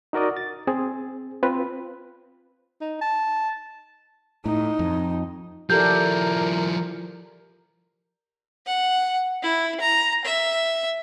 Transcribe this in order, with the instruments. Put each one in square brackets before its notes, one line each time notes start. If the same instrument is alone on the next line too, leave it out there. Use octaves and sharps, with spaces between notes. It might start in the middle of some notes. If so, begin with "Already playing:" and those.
[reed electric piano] D#4 F#4 A#4 D5 D#5
A6
C4 G#4
C4 F4 B4
[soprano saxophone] D#4
A5
[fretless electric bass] A2 [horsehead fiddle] D#4
[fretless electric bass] F2
[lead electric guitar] F3 E4 [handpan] G4 A4 D5 [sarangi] A#4 [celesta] G6
[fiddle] F#5
E4
A#5
E5